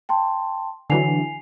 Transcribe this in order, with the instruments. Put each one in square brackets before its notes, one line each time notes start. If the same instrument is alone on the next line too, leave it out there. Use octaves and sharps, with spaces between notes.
[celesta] G5 A5 C6
[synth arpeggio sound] D3 E3 F#3 [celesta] G#5 C7 F7